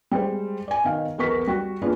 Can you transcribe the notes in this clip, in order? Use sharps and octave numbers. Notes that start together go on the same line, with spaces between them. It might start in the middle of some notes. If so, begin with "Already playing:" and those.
G3 G#3 C5
D5 G#5
B2 D#3 F5
B1 E2 B3 A#4 C#6 B6
G3 F#4
A#3 B3 C#4 D4 F4 G#4